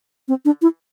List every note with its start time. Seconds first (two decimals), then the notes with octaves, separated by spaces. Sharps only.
0.28 C4
0.45 D4
0.62 E4